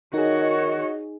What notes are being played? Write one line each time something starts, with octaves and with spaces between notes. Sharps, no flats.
D#3 D#4 F#4 G#4 C#5 D#5